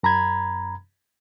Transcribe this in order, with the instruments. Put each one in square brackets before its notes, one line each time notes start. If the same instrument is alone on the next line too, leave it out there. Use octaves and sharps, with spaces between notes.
[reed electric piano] F#2 A#5 B5 G#6